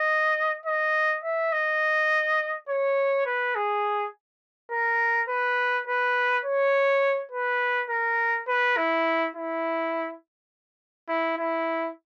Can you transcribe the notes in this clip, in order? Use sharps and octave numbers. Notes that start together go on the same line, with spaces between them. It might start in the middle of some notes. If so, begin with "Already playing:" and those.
Already playing: D#5
D#5
E5
D#5
C#5
B4
G#4
A#4
B4
B4
C#5
B4
A#4
B4
E4
E4
E4
E4